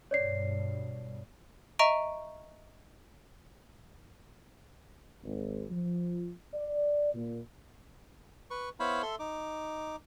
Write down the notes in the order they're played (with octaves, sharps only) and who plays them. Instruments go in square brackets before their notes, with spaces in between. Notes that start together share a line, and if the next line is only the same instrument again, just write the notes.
[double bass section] G2 B2 [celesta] C#5 D5 C7
[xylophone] D#5 E5 A#5 C#6 D7 D#7
[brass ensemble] G#1
F3
D5
A#2
[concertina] B4 C#6
B3 E4 C5 C#5 F5 B5
A4 E5 C6
D#4 D6